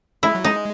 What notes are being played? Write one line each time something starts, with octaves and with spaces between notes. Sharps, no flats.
G#3 E4
F#3
G#3 D#4